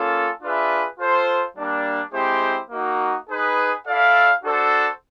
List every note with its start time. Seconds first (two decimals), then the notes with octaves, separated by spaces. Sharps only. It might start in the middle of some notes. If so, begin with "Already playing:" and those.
Already playing: A#3 C#4 F4 A4
0.41 D4 F4 G#4 B4 E5
0.98 F4 A4 C5
1.55 G3 A#3 D4
2.12 G#3 C4 E4 G4 C5
2.70 A#3 D#4 F#4
3.28 D#4 G#4 B4
3.85 E4 A4 D5 F5
4.42 D4 F#4 A4 C5